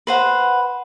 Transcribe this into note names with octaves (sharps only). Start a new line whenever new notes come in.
B4 C5 F#5